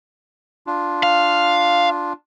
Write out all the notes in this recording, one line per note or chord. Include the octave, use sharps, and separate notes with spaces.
D4 F4
F5